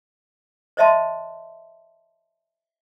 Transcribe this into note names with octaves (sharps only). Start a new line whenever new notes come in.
C5 C#5 D#5 E5 A5 C6